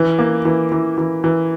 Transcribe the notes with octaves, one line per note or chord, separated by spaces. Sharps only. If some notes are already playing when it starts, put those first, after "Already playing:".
Already playing: E3
A#3
E3
E3
E3
E3